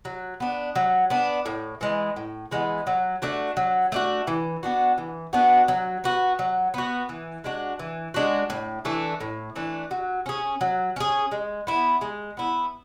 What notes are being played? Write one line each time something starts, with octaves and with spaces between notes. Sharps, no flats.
F#3
B3 D4
F#3
B3 D4
A2
E3 G#3 B3
A2
E3 G#3 B3
F#3
A3 D4 F#4
F#3
A3 D4 F#4
E3
B3 D4 F#4
E3
B3 D4 F#4
F#3
B3 F#4
F#3
B3 F#4
E3
G#3 D4 F#4
E3
G#3 D4 F#4
A2
E3 A3 D4
A2
E3 A3 D4
F#3
C#4 G#4
F#3
C#4 G#4
G#3
B3 E4
G#3
B3 E4